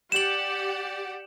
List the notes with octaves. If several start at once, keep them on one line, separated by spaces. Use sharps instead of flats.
G4 D5 F#5 E7 F#7